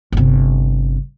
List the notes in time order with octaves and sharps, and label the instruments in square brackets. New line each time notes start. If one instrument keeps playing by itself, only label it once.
[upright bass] G1 C3